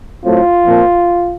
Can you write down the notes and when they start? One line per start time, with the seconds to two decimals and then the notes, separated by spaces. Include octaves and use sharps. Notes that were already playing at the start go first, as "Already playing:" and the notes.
0.24 A2 F#3 A3 C4 F4
0.66 A#2 F3 C4